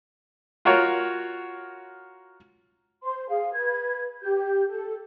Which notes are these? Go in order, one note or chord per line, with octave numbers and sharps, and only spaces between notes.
F4 F#4 A#4 C#5
C5 C6
G#4 F5
B4 G#6
G4 G6
A4